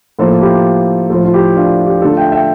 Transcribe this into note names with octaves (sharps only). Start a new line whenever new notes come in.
A2 F3 A#3 F4 A4
E4 G4
A2 F3 A3 F4 A4
F4
E4 G4
D4 F4
E4 G4
D3 A3 F4 A4
E5 G5
E5 G5